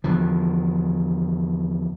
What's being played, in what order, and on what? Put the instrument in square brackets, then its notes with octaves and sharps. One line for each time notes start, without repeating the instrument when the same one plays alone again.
[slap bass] E2 D3 F3